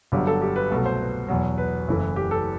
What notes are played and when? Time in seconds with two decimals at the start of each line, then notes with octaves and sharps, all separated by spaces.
0.12 G1 G2 D3 F#3 G4
0.27 A4
0.42 G4
0.56 B4
0.70 C2 B2 F#3 A3
0.86 C5
1.00 B4
1.28 E2 B2 F#3
1.58 B4
1.88 F#1 F#2 E3 A3
2.16 G4
2.31 A4